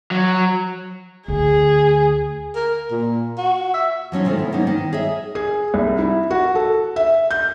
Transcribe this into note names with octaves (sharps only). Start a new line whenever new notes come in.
F#3
D2 G#4
A#4
A#2
F#4
E5
F3 F#3 C#4 D#4
C3 D#3 G#3 A3 D4 F4
B3 E4
F#3 A#3 B3 C#4 D#4
D#3
G#4 C#5 D#5 E5
G#4
C2
E4
F#4
A4
E5
G6